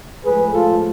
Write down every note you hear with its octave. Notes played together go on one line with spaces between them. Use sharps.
A2 F3 G#3 G#4 B4
F4 A4